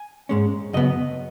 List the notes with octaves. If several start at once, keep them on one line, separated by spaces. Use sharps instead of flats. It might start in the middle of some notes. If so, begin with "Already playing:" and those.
Already playing: G#5
G#2 G#3 C#4
F#2 C#3 B3 D#5